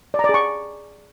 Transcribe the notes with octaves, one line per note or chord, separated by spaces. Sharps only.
D5
A#5
D5
G#4
C#6